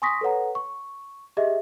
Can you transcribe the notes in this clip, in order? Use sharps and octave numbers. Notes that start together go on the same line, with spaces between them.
G#5 C6 C#6 D#6 A#6 B6
A4 B4 C#5 F#5 A#5
C#6
G4 G#4 D#5 E5